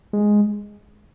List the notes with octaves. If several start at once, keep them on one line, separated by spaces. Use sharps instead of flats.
G#3